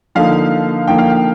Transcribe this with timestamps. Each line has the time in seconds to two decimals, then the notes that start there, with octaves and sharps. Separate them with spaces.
0.15 D3 F3 A#3 D#4 F5
0.88 D3 F3 A#3 D#4 G5
0.98 F5
1.10 G5